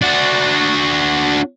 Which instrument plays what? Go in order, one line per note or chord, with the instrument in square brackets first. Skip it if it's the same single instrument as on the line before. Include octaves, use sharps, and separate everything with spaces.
[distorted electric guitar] D4 F#4